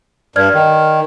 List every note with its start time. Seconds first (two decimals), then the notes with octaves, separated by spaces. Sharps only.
0.36 G2 D5 F6 G#6
0.54 D#3